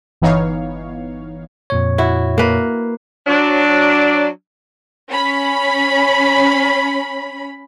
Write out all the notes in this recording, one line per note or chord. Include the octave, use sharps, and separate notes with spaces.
G1 E3 B3 D#4 C#5 F5
F2 A#2 C#5
E4 F#4
A#3 B4
F#3 D4
C#4 B5